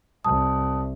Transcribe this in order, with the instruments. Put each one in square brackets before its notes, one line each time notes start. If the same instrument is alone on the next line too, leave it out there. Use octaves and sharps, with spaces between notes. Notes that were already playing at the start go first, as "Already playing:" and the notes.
[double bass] C2 [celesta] A5 D#6